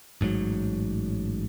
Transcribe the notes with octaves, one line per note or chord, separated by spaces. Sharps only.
A1 G#2 C3 F#3